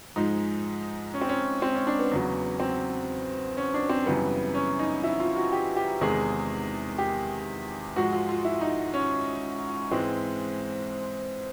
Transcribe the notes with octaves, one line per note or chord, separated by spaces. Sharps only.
G#2 F3 G#3 D#4
C#4
C4
C#4
C4
C#4
D4
B3
E2 C#3 F#3
C4
C#4
D4
C4
F#2 C#3 E3 G3 B3
C#4
D#4
E4
F4
F#4
G4
G4
E2 C3 D#3 G#3 G#4
G4
G#2 F3 G#3 F#4
F4
F4
E4
D#4
C#4
G#2 E3 G#3 C4